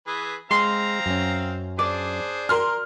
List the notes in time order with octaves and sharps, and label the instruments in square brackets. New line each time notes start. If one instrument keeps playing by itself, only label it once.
[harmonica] E3 G#4 B4
[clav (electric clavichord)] G#3 [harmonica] C4 F5 A#5 [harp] C6
[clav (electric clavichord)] F#2 C#4
[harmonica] D4 G#4 C5 [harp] D5
[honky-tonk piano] A#4 C6 F6